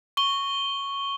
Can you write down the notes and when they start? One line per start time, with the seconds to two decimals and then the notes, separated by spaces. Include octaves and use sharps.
0.17 C#6 G7